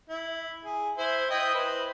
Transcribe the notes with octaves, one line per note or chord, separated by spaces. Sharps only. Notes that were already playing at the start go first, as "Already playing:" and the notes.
E4
G#4
E4 C5
E4 D#5 G5
B4 C5